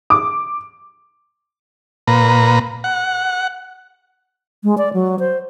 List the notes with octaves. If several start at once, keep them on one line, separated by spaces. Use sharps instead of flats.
D6
A#2 B4 A#5
F#5
G#3
D5
F#3
C5